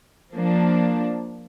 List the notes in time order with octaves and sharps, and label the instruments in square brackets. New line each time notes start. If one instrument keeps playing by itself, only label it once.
[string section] F3 A#3 D4